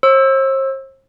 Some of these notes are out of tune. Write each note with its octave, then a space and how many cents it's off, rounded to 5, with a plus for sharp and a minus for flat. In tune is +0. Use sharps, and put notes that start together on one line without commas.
C5 +40 E6 +0